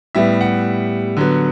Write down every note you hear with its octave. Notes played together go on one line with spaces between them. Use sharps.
A2 G3 B3 E5
F#5
D3 F#3 B3